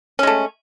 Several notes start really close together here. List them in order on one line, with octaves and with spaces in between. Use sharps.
C#4 G#3 A3